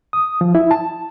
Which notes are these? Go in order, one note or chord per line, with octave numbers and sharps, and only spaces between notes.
D#6
F3
E4
A5